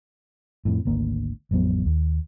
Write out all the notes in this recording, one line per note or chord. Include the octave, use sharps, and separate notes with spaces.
F2 A2
G#1 D2 A#3
A1 F2 F#3 B3
D#2